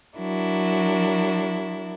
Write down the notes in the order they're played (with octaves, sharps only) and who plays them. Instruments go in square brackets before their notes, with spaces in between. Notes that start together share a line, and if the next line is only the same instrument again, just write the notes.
[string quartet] F#3 D4 E4 A#4